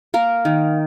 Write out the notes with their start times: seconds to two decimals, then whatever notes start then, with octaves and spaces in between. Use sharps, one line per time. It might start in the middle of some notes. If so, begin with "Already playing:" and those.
0.14 A#3 A#4
0.45 D#3